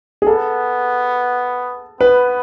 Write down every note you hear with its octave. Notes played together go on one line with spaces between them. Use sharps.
G#4
B3 A4
B3 B4